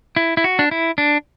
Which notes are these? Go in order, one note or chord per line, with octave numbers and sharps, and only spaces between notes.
E4
E4
F#4
D4
E4
D4